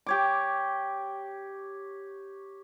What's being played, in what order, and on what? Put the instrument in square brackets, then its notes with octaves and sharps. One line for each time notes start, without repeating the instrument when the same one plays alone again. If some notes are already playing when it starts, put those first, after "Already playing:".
[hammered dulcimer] G4 C#5 D6